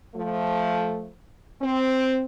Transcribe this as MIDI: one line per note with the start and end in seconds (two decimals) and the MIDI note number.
0.15 1.08 53
0.15 1.08 57
1.61 2.25 60